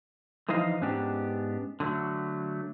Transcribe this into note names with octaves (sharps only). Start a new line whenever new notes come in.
D3 E3 F3 D#4 D#5 F5
G#2 B3 C#4 D4 G4
D3 F#3 A3